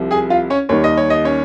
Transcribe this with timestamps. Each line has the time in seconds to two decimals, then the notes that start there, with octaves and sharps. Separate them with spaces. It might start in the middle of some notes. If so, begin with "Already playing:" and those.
Already playing: C2 C3 F3
0.11 G#4 G#5
0.30 F4 F5
0.50 C#4 C#5
0.69 D#2 D#3 G3 C#5
0.84 D#5
0.97 C#5
1.10 D#5
1.25 C#4 C#5